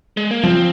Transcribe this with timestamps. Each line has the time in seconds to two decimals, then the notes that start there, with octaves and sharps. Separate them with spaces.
0.17 G#3
0.31 A#3
0.43 F3 C4